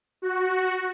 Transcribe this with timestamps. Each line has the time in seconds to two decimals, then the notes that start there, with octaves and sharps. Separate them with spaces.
0.22 F#4